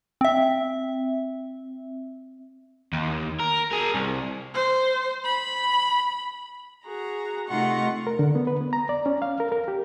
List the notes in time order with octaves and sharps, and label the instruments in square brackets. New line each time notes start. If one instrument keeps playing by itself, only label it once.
[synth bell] C4 E5
[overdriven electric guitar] D#2
A#4
G#4 A#4
C2
[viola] C5
B5
[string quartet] F#4 G#4 A#5
C3 A3 D#4 F4 F#5 C#6
[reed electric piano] A#4
D3
B3
B4
B3
A#5
D5
C#4
F5
A#4
A#4
G4